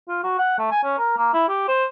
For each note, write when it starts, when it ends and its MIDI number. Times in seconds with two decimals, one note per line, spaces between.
0.09 0.19 65
0.23 0.35 66
0.39 0.58 78
0.59 0.66 57
0.71 0.83 80
0.84 0.95 61
0.98 1.17 70
1.17 1.29 58
1.33 1.48 64
1.49 1.68 67
1.68 1.85 72